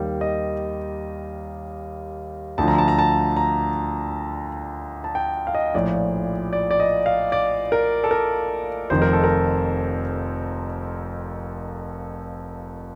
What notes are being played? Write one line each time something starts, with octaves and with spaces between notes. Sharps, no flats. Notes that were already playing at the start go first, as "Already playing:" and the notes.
Already playing: D#2 D#3 G3
D#5
D2 D3 F3 A5
A#5
A5
A#5
A5
A#5
A5
G5
F5
D#5
A#1 A2 F3 D5
D5
D5
D#5
F5
D5
A#4
A4
A#4
F1 F2 D#3 C5
A#4
A4
A#4